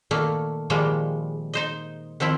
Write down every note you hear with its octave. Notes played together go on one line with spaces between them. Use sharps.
A#2 D#3 A3 A#3
A#2 D#3 F3 G3 G#3 A#3
D#4 C5 D#5
D#3 F3 C4 E4